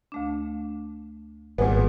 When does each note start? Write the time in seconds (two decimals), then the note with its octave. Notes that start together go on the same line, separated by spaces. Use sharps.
0.12 D2 A3 D4
1.58 G#1 A#2 G3 B3 G#4 F#5 G#5